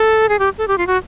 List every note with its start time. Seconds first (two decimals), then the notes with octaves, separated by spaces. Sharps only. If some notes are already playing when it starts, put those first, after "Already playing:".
Already playing: A4
0.29 G#4
0.39 G4
0.58 A4
0.68 G4
0.78 F4
0.87 F#4